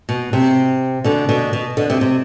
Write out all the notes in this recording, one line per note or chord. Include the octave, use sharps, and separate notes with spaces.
B2
C3
B2 D3
B2 D3
B2
B2 D3
C3
C3